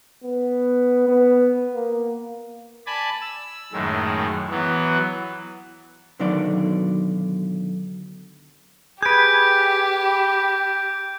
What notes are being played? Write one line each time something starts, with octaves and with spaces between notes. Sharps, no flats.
B3
B3
A#3
D5 G#5 A5 B5
E6
F#2 A2 D#3 G#3
E3 F#3 B3
B1 D3 D#3 F#3 D5
G4 G#4 B4 G6 D7